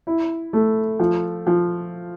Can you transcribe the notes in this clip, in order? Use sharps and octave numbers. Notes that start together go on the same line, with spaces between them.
E4
A3
F3
F3